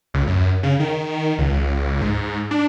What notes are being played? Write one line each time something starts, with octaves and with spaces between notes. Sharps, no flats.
C#2
F#2
C#3
D#3
C#2
G#2
D4